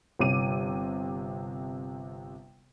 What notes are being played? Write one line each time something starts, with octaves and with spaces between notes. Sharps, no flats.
G1 C3 D6 D#7